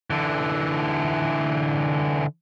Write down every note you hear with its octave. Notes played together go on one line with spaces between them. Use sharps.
D3 E3